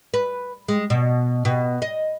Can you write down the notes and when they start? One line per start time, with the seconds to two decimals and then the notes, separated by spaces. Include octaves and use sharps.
0.14 B4
0.68 G#3
0.90 B2
1.45 B2
1.82 D#5